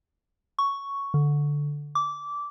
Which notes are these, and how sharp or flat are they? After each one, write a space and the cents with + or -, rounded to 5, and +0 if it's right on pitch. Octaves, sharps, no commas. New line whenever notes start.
C#6 +5
D3 -5
D6 -15